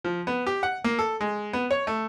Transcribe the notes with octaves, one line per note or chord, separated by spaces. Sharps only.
F3
B3
G4
F#5
A#3
A4
G#3
B3
C#5
A3